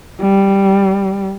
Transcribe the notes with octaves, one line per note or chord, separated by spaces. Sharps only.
G3